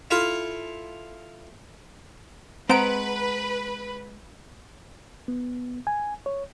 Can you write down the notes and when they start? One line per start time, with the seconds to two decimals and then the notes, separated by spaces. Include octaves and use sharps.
0.11 E4 F4 A4 F5
2.69 G#3 C4 B4 F#5 A#5 D7
5.28 B3
5.87 G#5
6.26 C#5